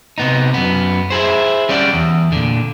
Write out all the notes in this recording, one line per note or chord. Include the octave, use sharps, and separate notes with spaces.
C3 B3 D#4
F#2 B3
E4 G#4 C5
G3 C#4 D5 E5 F#5
E2
A#2 D3